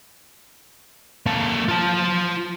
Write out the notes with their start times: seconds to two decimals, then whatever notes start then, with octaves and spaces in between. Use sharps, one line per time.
1.26 A#3 A4
1.69 F4 A5